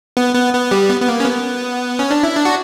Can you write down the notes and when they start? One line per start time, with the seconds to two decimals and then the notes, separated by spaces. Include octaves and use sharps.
0.17 B3
0.35 B3
0.54 B3
0.71 G3
0.89 B3
1.01 B3
1.08 A#3
1.20 C#4
1.26 B3
1.99 C#4
2.11 D4
2.23 E4
2.36 D4
2.45 F#4